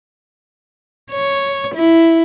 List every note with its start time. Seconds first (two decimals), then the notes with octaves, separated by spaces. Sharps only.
1.12 C#5
1.75 E4